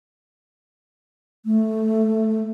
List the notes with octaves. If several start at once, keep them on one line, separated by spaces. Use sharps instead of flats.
A3